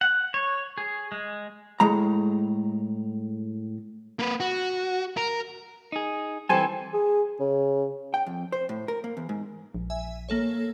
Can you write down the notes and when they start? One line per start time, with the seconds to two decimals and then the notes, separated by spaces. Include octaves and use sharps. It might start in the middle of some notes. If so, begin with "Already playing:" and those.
0.01 F#5
0.34 C#5
0.78 G#4
1.12 G#3
1.80 A2 G#3 A#5
4.19 A#3 B4
4.40 F#4
5.17 A#4
5.92 D#4 G#4
6.49 E3 G3 C4 A4 D5 G#5
6.93 G#4
7.40 C#3
8.14 G5
8.26 F2
8.52 C5
8.69 A2
8.88 A#4
9.04 A#3
9.17 E2
9.29 G#2
9.75 A#1
9.90 E5 G#5
10.29 A#3 A4 C#5